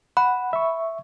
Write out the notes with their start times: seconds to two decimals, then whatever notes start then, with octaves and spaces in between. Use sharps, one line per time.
0.17 F#5 B5
0.53 E5 C#6